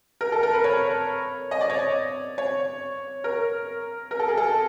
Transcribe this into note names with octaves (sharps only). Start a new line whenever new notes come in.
A#4
A4
A#4
B4
C#5
D#5
D5
C#5
D5
C#5
A#4
A#4
A4
G#4
A4